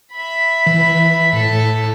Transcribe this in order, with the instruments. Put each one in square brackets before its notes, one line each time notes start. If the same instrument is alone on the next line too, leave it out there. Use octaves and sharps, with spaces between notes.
[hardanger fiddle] E5 B5
[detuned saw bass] E3
[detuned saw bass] A2 [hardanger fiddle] A4